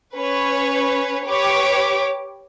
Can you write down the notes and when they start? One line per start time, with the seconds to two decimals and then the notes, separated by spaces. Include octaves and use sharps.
0.15 C#4 B4 C#5
1.26 G4 B4 C#5 D6